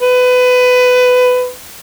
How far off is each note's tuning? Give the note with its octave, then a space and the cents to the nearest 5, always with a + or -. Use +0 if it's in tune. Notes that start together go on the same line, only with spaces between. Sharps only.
B4 +20